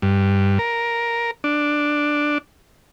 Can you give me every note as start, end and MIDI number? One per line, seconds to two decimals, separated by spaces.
0.02 0.58 43
0.59 1.31 70
1.44 2.38 62